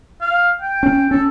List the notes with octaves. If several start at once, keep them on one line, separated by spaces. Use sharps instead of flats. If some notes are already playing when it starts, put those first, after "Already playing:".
F5
G5
C#4
C#4 A4